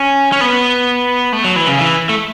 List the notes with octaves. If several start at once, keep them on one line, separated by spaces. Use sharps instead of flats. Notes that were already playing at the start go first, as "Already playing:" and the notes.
Already playing: C#4
C#4
B3
A3
F#3
E3
C#3
E3
A3